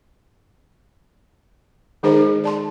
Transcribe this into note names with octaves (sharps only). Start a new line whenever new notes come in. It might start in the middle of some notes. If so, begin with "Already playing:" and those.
D#3 G#3 D#4 G#4 A#4 C5
D5 A5 C6